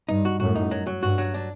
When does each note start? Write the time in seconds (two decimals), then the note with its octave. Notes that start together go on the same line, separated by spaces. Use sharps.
0.09 G2 D#4
0.25 F#4
0.40 F#2 A2 F#4
0.55 D#4
0.71 F#3
0.87 F#3
1.02 G2 F#4
1.18 F#3
1.34 D4